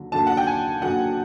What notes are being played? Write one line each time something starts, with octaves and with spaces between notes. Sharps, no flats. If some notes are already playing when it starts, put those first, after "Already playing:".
Already playing: D#2 D3 F#3
D#2 D3 F#3 A5
F#5
G5
G#5
D#2 D3 F#3 F#5